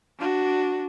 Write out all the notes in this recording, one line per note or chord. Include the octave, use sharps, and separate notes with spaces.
D4 F#4